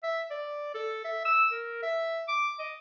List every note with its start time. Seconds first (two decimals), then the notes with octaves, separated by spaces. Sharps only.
0.03 E5
0.31 D5
0.74 A4
1.05 E5
1.25 E6
1.52 A#4
1.83 E5
2.28 D6
2.60 D#5